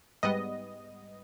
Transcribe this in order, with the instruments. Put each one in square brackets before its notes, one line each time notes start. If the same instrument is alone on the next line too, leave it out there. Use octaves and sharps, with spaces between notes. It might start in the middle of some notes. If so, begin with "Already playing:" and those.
[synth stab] G#2 G3 B3 D#5